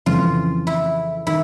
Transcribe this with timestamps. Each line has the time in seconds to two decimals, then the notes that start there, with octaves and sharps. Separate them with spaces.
0.06 F2 C#3 E3 F4
0.67 E4
1.27 D#3 E4